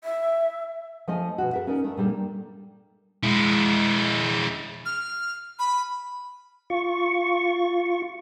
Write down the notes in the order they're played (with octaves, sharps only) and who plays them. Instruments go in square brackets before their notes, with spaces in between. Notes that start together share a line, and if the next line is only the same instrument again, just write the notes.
[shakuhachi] E5
[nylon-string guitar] F3 A3 D#5 G#5
B2 F#4
A4 A#4 E5
C#4 D#4 A#4 D5
A3
A#2 G3 D4 A4
[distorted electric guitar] G#3 E4
[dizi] F6
B5
[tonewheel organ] F4 C#6